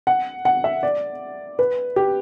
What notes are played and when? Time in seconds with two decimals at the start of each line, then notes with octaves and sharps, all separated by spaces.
0.07 F#5
0.45 F#5
0.64 E5
0.83 D5
1.59 B4
1.96 G4